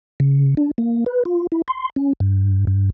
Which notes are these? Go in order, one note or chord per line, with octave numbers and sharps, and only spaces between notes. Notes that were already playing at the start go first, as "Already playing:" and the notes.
C#3
D4
A#3
B4
F4
E4
C6
C#4
G2
G2